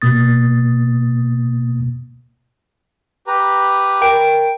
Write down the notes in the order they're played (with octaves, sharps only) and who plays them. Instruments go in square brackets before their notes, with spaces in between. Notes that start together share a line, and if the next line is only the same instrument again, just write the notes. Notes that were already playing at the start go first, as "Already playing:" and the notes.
[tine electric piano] B2 A#3 D#6 A6
[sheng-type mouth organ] G4 B4 A#5
[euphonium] A#4 [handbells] G5